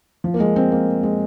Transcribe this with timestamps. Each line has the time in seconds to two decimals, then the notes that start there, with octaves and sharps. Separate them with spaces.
0.24 F3
0.34 A#3
0.40 G#3
0.56 C4
0.72 A#3
1.03 G#3